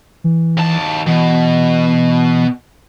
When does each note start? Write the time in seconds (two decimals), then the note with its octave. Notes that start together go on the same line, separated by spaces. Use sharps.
0.24 E3
0.57 D#2 A5
1.07 B2 E3